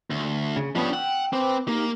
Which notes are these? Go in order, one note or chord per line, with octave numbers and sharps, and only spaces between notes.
D2
C#3
F3 B3 C#4 D4 G4
F#5 G5 E6
C4 B4 G5 D6
A#3 D#4 G4